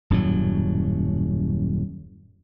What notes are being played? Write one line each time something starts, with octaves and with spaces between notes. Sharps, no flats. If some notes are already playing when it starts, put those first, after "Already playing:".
D#1 F#2 A2 F#3